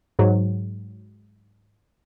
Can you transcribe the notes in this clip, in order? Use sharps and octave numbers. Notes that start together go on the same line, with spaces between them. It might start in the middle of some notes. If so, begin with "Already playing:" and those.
G#2 F#3